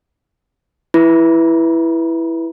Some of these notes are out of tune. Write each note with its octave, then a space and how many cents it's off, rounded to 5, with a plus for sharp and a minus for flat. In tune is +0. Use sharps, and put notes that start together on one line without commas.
E4 +0 B4 -10 B5 -20